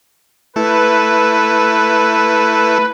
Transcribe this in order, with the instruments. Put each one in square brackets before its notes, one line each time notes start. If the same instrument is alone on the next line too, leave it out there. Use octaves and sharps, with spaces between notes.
[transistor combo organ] A3 E4 [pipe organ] B4